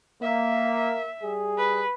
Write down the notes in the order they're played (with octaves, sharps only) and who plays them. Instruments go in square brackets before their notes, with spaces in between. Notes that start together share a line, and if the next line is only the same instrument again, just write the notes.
[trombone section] A#3 [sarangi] E5
[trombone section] G3 G#4
[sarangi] B4